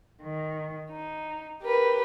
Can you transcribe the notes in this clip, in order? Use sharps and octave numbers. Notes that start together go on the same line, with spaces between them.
D#3
D#4
G4 A#4 B4